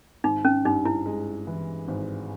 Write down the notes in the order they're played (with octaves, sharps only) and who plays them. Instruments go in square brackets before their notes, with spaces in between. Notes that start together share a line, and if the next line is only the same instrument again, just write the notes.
[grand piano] G#1 [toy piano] D#4
[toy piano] C#4
[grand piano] G2 [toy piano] D#4
[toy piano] E4
[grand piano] G#3
E3
G#1